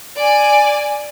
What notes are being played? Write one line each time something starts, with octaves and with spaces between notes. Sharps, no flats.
D5 G#5